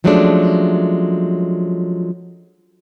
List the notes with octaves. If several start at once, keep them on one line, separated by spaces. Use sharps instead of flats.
F3 F#3 G#3 A3 C#4 D4